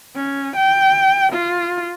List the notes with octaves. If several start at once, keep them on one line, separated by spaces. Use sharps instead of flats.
C#4
G5
F4